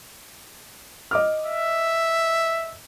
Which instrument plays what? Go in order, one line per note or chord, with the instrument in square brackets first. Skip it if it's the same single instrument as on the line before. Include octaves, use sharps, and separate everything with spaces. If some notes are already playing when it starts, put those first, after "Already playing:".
[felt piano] D#5 D6 F6
[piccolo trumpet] E5